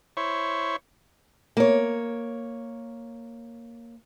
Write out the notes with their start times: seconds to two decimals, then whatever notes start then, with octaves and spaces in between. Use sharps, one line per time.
0.17 E4 C5 C#5 C#6
1.57 A#3 C#5